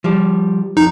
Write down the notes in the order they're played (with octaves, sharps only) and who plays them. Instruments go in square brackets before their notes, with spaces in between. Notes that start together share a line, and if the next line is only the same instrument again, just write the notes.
[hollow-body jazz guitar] F3 G3
[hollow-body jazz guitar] F2 [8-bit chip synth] D#4